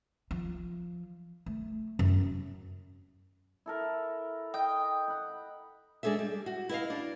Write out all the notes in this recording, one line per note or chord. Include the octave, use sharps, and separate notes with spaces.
F3
A3
F#2
E4 A4 A#4
D#5 G5
F#5 B5
G#3 D4 G#4 A4 E5
G3
F#4
E4 B4 D#5 F5
D4